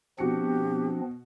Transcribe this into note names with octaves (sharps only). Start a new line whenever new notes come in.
B2 F3 C4 D4 F#4 G4 C#7